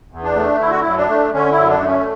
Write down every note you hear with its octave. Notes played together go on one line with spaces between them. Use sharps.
E2
D4
A3
D3 E4
F#4
F#2 E4
D4
A3
D3 C#4
E4
F#2
D4
A3
C#4